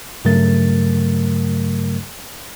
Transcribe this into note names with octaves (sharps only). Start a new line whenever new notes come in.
G2 C#3 F#3 A3 A#4 A6